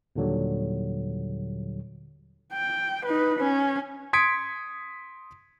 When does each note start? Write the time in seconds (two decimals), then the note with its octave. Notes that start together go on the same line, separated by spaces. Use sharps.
0.16 D#2 A#2 D3 F#3 G3
2.54 G5
3.06 D#4 B4
3.39 C#4
4.13 C6 D#6 G#6 B6 C#7 D7